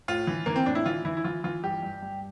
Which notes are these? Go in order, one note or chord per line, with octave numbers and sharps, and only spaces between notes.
A2 F4
E3
E3 A#3
C4
A2 D4
E4
E3 F4
E3 E4
E4
E3 F4
E3 F4
G2 G4
G2
G2